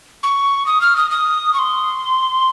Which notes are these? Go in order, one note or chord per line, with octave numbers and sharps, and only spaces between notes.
C#6
D#6
F6
D#6
D#6
C#6
C6